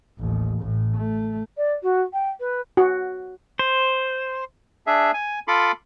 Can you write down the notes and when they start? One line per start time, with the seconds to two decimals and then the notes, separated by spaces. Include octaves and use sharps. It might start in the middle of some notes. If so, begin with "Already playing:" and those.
0.19 A1 D#2
0.61 A1 A2
0.97 A3
1.57 D5
1.83 F#4
2.13 G5
2.40 B4
2.77 F#4
3.59 C5
4.87 D4 G#4 E5
5.14 G#5
5.48 F4 A4 B5 C6 D6